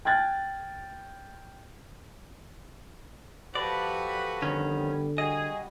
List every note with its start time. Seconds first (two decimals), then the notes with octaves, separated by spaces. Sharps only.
0.05 G5 F6 F#6 G#6 A6
3.55 F3 F#4 G4 A4 B4 D5
4.42 F2 D3 D#3 G3 B3 C#4
5.18 G3 F#4 G#4 D#5